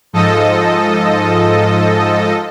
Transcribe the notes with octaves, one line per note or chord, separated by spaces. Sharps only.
G#2 F3 A4 D#5